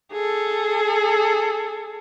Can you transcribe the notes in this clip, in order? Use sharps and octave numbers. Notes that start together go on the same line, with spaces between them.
G#4 A4